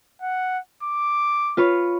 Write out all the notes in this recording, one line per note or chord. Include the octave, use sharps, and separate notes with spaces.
F#5
D6
F4 B4 C#5